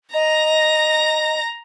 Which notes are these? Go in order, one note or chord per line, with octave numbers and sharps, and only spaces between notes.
D#5 A#5 A#6